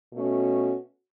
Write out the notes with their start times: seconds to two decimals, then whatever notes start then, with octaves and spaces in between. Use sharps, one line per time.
0.12 B2 A3 C#4 F#4